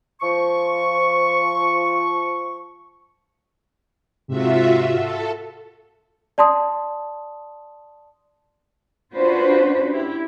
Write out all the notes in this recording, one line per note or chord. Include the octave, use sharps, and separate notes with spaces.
F3 C#6
G#2 C3 F4 F#4 E5
A4
D5 A5 C6 D#6
C#4 D4 F4 F#4 B4 C5
E4 G4